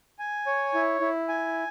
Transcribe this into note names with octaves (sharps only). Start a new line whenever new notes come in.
G#5
C#5
E4
E4
G#5